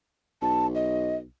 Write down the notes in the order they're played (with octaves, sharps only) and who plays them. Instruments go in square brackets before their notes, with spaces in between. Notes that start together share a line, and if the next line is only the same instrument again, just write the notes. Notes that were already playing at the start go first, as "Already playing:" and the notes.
[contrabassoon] B1 [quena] A5
[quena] D#5